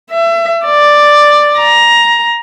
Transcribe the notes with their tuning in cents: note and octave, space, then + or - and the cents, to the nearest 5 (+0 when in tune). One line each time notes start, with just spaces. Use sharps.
E5 +30
D5 +5
A#5 +15